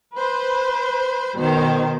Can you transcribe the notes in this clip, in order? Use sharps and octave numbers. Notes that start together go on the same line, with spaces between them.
B4 C5
B2 D#3 C5